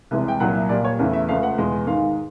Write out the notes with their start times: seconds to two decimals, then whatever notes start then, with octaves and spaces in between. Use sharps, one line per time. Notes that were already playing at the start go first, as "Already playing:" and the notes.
0.11 C2 C3 E3 G#3
0.28 G5
0.40 C2 A#2 F#3 F#5
0.55 E5
0.69 A#2 G3 D5
0.84 C#5
0.99 E2 C#3 E3 A3
1.13 E5
1.28 C#2 C#3 F3 A3 F5
1.43 F#5
1.58 E2 B2 G#3
1.87 G#2 D#3 G#3 F5